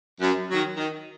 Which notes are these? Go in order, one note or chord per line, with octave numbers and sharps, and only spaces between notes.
F#2
D#3 F#3
D#3